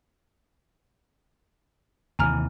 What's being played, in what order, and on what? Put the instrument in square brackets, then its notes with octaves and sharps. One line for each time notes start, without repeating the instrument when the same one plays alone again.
[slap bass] D#2 C3 E3 [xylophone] G#5 A#5 F6